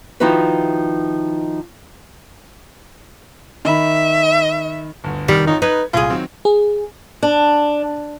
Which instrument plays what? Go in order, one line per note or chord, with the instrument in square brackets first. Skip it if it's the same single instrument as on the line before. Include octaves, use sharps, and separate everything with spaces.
[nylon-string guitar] D#3 F3 D#4 E4 F#4 B4
[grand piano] D#3 B5 [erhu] E5
[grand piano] G1 D2
[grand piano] F1 C#7 [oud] D#3 [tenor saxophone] G3
[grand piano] G#2 F4 C#5 [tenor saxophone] D#4
[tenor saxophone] D#4 [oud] B4 [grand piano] G#6
[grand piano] C2 G#6 [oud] A#2 G#4 [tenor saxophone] F4
[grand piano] D#3 F#3 C4
[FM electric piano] G#4
[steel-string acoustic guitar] D4